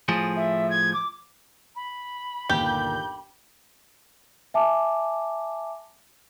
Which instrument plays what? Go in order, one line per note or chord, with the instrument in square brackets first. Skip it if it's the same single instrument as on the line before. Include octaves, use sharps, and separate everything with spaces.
[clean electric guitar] A2 F3 G#4
[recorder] E5
G#6
D6
[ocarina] B5
[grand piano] G1 D#2 A#2 [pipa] G4 [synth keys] G6
[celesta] E5 G#5 A5 D6